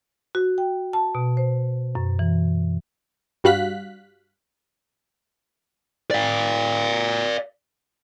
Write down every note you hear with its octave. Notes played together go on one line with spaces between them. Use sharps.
F#4
G5
A5
B2
C5
F#2
E3
G2 G3 F#4 F5 F#6 B6
D5 F5